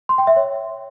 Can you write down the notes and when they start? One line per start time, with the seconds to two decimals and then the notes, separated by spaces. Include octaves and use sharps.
0.09 C6
0.18 G5
0.27 E5
0.36 C#5